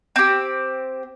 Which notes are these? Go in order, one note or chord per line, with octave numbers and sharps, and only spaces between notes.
C4 G4